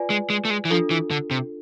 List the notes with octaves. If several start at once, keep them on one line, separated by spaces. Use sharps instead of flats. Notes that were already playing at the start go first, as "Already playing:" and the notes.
Already playing: F4 B4 D5 G#5
G#3
G#3
A3
G#3
E3
F3 D4 F4 A4
E3
D3
C3